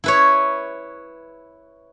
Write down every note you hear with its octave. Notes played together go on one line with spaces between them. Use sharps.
E4 B4 C#5